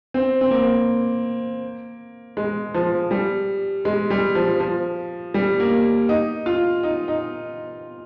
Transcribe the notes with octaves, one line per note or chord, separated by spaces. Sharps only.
C4
C4
A#3
G#3
F3
G3
G#3
G3
F3
F3
G3
A#3
D#4
F4
D#4
D#4